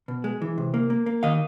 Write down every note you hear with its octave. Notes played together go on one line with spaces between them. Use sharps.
B2
G#3
E3
C3
A#3
A#3
A#3
D#3 D#5 F5